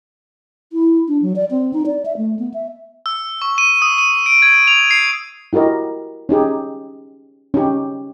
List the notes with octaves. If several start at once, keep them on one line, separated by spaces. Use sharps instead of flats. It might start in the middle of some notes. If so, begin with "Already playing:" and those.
E4
D4
F#3
D5
C4
D#4
D5
E5
A3
B3
E5
E6
C#6
D#7
D#6
D#7
D7
G#6
F7
C7
E4 F#4 G4 A#4 D#5
C#4 D#4 G4 G#4
C#4 D#4 G4